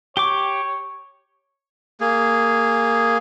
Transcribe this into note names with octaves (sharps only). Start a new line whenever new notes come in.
G4 C#5 G5 D6
A#3 G#4